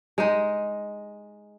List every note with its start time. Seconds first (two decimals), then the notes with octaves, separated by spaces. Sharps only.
0.18 G#3 D#4